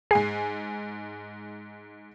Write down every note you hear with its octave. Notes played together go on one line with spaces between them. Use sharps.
G#2 G#4 G#5 C7